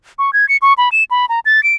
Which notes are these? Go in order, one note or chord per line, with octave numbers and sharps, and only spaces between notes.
C#6
G#6
C#7
C#6
B5
E7
B5
A#5
A6
D7